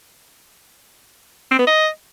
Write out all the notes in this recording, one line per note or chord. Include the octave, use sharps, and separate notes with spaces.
C4
B3
D#5